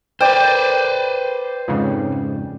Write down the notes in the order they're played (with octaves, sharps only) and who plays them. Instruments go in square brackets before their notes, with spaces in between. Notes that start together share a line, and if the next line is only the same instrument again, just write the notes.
[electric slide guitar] B4 C5 [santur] D5 G5
[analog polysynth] F2 G#2 C#3